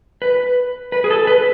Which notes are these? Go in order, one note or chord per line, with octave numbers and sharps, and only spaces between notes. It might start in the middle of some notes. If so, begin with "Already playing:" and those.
B4
B4
G#4
A4
B4